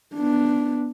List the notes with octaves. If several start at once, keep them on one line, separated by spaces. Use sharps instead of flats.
B3 D4